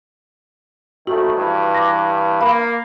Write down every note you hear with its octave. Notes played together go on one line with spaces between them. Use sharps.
A#1 D#3 A3 F#4
G2 E3
D6 A#6
A#3 F5 B5